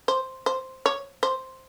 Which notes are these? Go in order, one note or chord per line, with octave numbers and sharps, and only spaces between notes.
C5
C5
C#5
C5